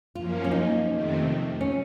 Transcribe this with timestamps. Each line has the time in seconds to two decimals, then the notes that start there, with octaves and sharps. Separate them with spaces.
0.15 F#2 F3 A#3 C#4 F4
0.44 C#4
0.51 D#4
0.88 F2 C3 D#3 A3 C4
1.61 C#4